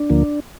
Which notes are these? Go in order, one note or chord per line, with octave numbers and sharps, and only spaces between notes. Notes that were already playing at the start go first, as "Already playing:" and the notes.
Already playing: D4
D2 D3 F3 A#3